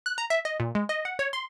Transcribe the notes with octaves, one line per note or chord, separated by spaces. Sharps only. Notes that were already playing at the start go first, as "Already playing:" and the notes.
F#6
A#5
E5
D#5
A#2
G#3
D#5
F#5
C#5
C6